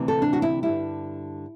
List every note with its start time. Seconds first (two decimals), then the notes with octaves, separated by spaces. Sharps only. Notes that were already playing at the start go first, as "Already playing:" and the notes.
Already playing: D2 C3 E3
0.08 A4
0.22 D4
0.33 F#4
0.42 E4
0.63 G2 D3 G3 E4